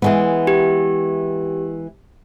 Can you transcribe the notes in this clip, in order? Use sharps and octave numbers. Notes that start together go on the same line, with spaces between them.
E3 G#3 B3
G4